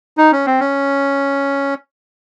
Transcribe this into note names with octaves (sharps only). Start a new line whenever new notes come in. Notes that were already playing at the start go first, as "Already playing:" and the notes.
D#4
C#4
C4
C#4